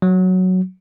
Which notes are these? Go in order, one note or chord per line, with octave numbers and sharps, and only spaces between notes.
F#3